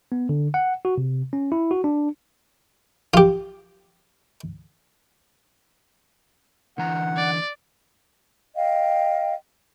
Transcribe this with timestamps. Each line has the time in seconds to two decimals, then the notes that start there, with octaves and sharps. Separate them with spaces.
0.12 B3
0.29 D3
0.54 F#5
0.85 F#4
0.98 C3
1.33 C#4
1.52 E4
1.71 F#4
1.84 D4
3.14 F4 G4
6.78 D3 E3 F#5 A#5
7.17 D5
8.55 D#5 F5 G5